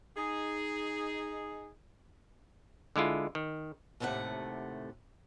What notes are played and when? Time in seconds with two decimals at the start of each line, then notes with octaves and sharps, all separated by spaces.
0.17 D#4 G#4
2.96 D3 G#3 E4 F4
3.35 D#3
4.00 D#2 A2 C3 A3 F#5